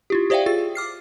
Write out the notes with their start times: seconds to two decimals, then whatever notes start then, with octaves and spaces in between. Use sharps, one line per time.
0.10 E4 F4 G4
0.30 G4 C5 D5 E5 F5 G5
0.46 F4 G#4 A6
0.75 D6 F6 C7